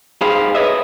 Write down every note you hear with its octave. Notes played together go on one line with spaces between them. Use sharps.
G#2 G4 G#4 C5 F5 B5
B4 C#5 D#5 E5